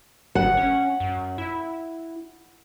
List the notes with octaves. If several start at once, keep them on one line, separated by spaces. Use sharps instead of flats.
G1 F#5
C#4
F#2
E4